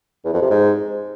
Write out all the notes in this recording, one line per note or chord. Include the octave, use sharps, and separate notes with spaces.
E2
F2
C3
G#2